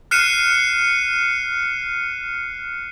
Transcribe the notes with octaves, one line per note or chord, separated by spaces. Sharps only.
F6 F#6 C7 C#7 D#7 E7